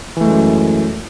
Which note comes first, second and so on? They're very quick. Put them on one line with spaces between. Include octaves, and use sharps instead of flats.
E3 A3 G#3 F#2